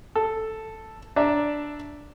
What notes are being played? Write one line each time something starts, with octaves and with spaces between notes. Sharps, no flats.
A4
D4 D5 E5 A#5